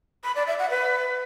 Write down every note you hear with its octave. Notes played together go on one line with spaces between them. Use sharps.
B5
D5
E5
F#5
B4